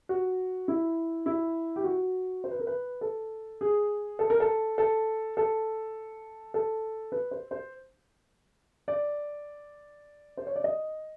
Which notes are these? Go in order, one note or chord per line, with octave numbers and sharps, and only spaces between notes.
F#4
E4
E4
G4
F#4
C5
B4
A#4
B4
A4
G#4
A4
A#4
A4
A4
A4
A4
B4
C5
C5
D5
C5
C#5
D5
D#5